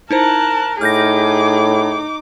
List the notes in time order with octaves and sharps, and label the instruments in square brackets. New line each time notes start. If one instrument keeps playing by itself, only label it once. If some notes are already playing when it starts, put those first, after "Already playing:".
[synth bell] D#4 E4 C5 [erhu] A#4 [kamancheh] A5 F#6
[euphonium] A2 [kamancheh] D#4 D6 [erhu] G#4 [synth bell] F6 G6 A#6